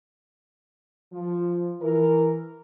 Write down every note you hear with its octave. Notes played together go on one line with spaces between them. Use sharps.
F3
E3 A#4